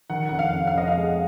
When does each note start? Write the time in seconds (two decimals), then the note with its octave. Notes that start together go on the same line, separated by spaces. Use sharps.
0.10 D#3 F#5
0.29 F1 F#5
0.39 F5
0.53 F2
0.67 F5
0.74 F1 D#5
0.88 F5
0.97 G#3